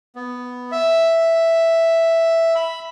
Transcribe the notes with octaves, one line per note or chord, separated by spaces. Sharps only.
B3
E5
B5